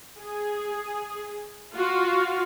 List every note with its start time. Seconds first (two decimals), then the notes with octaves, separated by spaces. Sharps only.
0.18 G#4
1.74 F4 F#4